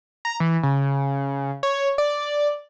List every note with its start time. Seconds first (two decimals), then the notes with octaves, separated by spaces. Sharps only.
0.25 A#5
0.40 E3
0.63 C#3
1.63 C#5
1.98 D5